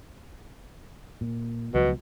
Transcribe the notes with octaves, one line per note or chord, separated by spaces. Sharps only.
A#2
C#2 B2 F3 F#3